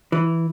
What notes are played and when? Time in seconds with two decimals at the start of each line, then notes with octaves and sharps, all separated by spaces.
0.12 E3